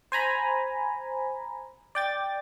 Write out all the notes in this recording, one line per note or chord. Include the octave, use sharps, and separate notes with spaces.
C5 G#5 A#5 B5
D5 G5 A6